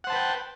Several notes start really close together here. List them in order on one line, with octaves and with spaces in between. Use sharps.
F#5 C5 A5 B4 G5